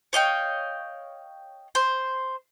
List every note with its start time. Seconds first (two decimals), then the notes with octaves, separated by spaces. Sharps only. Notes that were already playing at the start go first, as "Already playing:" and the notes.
0.13 C#5 D#5 F5 G5
1.75 C5